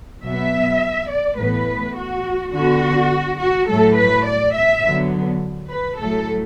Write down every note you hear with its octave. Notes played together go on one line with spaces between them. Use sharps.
B2 F#3 B3 E5
D5
A2 E3 B3 B4
F#4
D3 B3 F#4
F#4
A2 F#3 A3 A4
B4
D5
E5
D3 F#3 B3
B4
A2 F#3 A3 A4